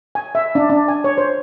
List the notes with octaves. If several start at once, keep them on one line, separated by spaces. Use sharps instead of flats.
G#5
E5
D4
D4
G#5
C#5
C5